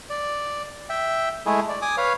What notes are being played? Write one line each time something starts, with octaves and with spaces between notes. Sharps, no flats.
D5
E5 G5
G#3 A3 E4 G#4
D5
G#5 D6 D#6
B4 C#5 F5